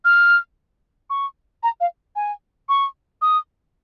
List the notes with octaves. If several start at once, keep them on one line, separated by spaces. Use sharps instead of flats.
F6
C#6
A#5
F5
G#5
C#6
D#6